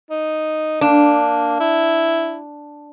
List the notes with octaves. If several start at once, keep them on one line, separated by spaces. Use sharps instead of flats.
D#4
A#3 D4
E4